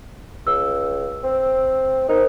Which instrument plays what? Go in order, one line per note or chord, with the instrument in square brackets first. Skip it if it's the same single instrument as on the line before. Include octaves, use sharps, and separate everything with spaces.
[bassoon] C#2 [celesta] E6
[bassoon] C4
[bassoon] D#4 [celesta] A#4 C5